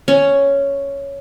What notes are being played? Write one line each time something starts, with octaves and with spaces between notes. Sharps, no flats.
C#4